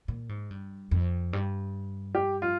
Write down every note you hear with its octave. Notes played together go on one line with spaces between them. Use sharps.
A#2
G#2
G2
F2
G2
G4
F4